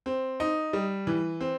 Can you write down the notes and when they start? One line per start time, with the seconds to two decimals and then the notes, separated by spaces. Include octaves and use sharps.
0.06 C4
0.40 D#4
0.73 G3
1.07 E3
1.41 C4